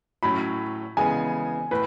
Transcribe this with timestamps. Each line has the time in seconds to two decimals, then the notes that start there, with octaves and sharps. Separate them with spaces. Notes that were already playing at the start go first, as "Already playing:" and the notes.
0.23 A2 F#3 C#4 B5
0.97 C#3 E3 G#3 B3 G#5
1.71 A2 B4